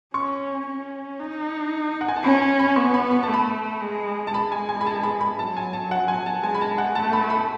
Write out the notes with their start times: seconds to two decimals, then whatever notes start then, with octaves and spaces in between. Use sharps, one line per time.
0.14 C#4 C#6
0.67 C#4
1.19 D#4
2.01 F#5
2.08 G#5
2.16 A5
2.23 C#4 B5
2.41 G#5
2.59 B5
2.76 B3 C#6
2.94 B5
3.11 B5
3.23 A5
3.29 A3 B5
3.81 G#3
4.27 A5
4.34 G#3 B5
4.52 G#5
4.69 G#5
4.81 B5
4.87 A5
5.03 B5
5.21 B5
5.39 F#3 A5
5.57 G#5
5.73 A5
5.91 F#5
6.08 G#5
6.26 A5
6.43 G#3 G#5
6.54 B5
6.61 A5
6.78 F#5
6.95 A3 A5
7.13 B5
7.30 B5